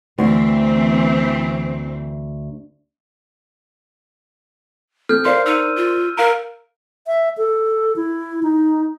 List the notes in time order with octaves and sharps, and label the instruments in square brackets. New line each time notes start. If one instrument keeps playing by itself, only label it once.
[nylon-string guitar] D2 [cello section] E3 C4
[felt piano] C4 [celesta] A4 [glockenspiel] F6 G6
[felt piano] A#4 C5 D5 [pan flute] F5 [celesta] C6
[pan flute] D#4 [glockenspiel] E6 D#7
[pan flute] F4
[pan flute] A#4 [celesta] F5 A#5
[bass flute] E5
A4
E4
D#4